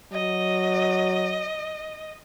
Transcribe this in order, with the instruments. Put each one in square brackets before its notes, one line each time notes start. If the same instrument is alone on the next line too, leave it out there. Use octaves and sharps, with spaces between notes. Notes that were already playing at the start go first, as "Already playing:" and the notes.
[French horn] F#3 [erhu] D#5